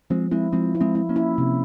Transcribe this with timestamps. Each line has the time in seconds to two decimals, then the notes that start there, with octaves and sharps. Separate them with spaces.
0.10 F3 G#3 C4
0.31 G#3 C4 E4
0.52 F3 G#3 C4
0.75 E4
0.81 G#3 C4
0.95 E4
1.09 A#3 C#4
1.16 E4
1.38 C3